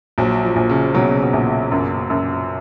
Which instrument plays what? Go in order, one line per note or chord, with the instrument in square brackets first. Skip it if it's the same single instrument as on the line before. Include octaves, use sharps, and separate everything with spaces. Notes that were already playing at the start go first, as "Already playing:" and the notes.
[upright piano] A#1 [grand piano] F#3
[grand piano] F3
[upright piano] A#1
[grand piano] C#3
[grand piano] B2 [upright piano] F#3
[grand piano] C#3
B2
[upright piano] A#1
F#2
F#2